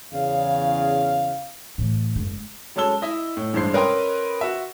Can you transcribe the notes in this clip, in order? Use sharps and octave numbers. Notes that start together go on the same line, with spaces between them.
E2 C#3 F5
A2 E3
F#1 G#3
F#3 G#3 C#4 A4 E6 G7
E4 D#5
A2
A1 G2 G#3 C5 C7
C#4 A#4 B4 D#5 G5 C6
F#4 E5